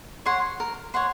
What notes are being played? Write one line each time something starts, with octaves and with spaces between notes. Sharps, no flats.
C#5 F#5 C6
A#4
C#5 F#5 C6